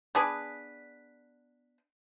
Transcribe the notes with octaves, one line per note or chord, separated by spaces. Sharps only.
B3 D4 G#4 B4